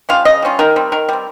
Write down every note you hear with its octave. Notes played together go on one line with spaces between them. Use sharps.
G3 C#4 F4 F5
C#3 D#5
G3 C#4 F4
D#3 A#4
G3 C4
D#3 A#4
G3 C4